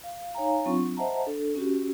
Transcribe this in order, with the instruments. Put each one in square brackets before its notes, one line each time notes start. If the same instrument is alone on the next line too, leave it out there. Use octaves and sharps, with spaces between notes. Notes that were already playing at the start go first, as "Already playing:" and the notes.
[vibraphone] F5
D#4 C#5 F5 G#5 A#5
F#3 C4 D4 F4 C#6
C5 D#5 E5 F#5 A5 A#5
D4 A4
C#4 F#4 G4